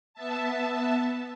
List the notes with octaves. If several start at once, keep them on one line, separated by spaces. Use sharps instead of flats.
B3 E5 A5